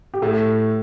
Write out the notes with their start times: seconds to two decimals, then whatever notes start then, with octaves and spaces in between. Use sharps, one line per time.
0.14 G4
0.22 A2 A4